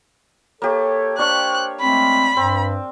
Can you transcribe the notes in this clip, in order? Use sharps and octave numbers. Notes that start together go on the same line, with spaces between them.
A#3 G4 A4 C#5
D4 C5 C#5 F5 G5 C#6 F#6
G#3 A3 C4 B5
G2 C4